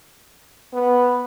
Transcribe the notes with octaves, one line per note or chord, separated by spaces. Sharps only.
B3